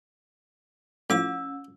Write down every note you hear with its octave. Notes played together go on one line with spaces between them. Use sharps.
A2 F3 C#4 E6